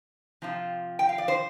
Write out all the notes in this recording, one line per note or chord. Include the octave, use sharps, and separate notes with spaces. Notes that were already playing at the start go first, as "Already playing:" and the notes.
C3 F3 C4 F4
G5
F5
D5
C5